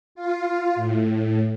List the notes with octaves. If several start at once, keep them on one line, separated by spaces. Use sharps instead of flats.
F4
A2